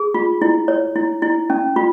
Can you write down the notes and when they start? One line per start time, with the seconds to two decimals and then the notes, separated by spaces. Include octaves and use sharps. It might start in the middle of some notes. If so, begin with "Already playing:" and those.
Already playing: G#4
0.14 F4
0.42 E4
0.68 C#5
0.96 E4
1.22 E4
1.50 C#4
1.76 F4